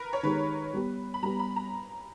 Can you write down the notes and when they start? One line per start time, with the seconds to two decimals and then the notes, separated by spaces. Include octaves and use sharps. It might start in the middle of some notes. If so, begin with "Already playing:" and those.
Already playing: A#4 B4
0.13 C#5
0.23 D#3 G#3 D#4 G4 B4
0.73 G3 B3 G4
1.14 B5
1.23 G3 B3 G4 A#5
1.39 B5
1.56 A#5